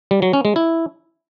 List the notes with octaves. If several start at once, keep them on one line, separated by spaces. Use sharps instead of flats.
G3
F#3
C#4
G#3
E4